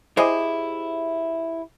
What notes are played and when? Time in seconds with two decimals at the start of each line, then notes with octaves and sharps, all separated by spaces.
0.17 E4 G4 G#4 C5 D#5